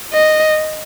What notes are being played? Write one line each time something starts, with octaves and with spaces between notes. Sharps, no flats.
D#5